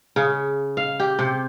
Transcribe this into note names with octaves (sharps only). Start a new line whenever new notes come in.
C#3
F5
G4
C3